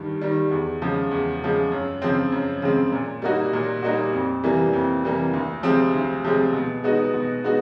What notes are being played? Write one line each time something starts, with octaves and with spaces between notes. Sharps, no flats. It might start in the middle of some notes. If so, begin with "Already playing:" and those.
Already playing: G2 D#3 G3
D#3 G3
E2
C#3 F3 G#3
E2
C#3 F3 G#3
F#2
C#3 F3 G#3 C4
F#2
C#3 F3 G#3 C4
A#2
G3 A#3 D#4 F#4
A#2
G3 A#3 D#4 F#4
F2
C3 E3 G3 A#3
F2
C3 E3 G3 A#3
D2
C3 F3 G#3 C4
D2
C3 F3 G#3 C4
B2
G#3 B3 D#4 F#4
B2
G#3 B3 D#4 F#4